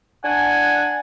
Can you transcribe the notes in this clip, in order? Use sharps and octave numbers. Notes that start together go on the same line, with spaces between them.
D4 F#5 G#5